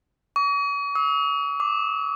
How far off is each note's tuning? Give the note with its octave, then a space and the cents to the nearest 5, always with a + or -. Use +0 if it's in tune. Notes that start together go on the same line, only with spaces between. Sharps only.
C#6 +45
E6 -45
D6 +5